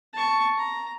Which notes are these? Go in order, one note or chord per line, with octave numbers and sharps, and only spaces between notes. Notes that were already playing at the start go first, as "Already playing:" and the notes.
A5 C#6
A#5